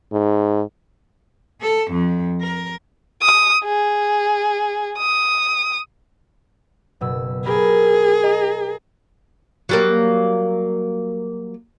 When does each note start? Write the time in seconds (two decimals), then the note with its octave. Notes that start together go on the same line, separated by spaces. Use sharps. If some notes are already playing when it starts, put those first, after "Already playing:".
0.12 G#2
1.62 A4
1.92 F2
2.41 A#4
3.22 D#6
3.65 G#4
4.98 D#6
7.01 F#1 B2 E6
7.45 G4 G#4 A#4 B5
8.23 D#5 A#5
9.69 F#3 G3 A#3